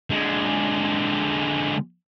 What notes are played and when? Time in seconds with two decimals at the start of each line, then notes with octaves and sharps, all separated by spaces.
0.10 D3 G#3